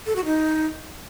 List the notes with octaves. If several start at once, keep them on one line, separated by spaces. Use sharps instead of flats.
A4
F#4
D#4